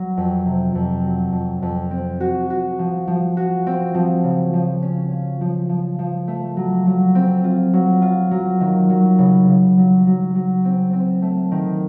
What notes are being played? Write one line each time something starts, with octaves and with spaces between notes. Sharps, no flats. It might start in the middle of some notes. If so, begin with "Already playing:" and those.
Already playing: F#3
F2
C3
F2
F#3
F2
F2
C4
F#4
F#4
F3
F3
F#4
C4
F3
C#3
F3
C#4
C#4
F3
F3
F3
A3
F#3
F#3
C4
F4
F#3
F4
F#3
D#3
F#3
C#3
C#3
F#3
F#3
F#3
C4
C4
A3
D#3